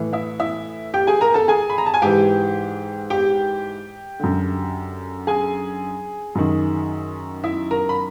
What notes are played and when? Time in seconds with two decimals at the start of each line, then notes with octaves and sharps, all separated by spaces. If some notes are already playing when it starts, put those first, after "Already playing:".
Already playing: A2 E3
0.13 E4 E5
0.40 E4 E5
0.94 G4 G5
1.07 G#4 G#5
1.21 A#4 A#5
1.34 A4 A5
1.48 G#4 G#5
1.70 B5
1.78 A#5
1.86 A5
1.94 G#5
2.02 G#2 E3 G4 G5
3.10 G4 G5
4.20 F#2 D3
5.27 G#4 G#5
6.35 F#2 D#3
7.44 E4 E5
7.71 A#4 A#5
7.89 B5